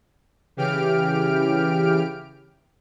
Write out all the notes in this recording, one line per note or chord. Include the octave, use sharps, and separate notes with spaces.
C#3 E3 G4 F6 D7